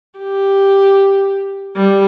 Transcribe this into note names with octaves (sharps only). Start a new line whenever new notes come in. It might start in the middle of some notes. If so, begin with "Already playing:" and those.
G4
G3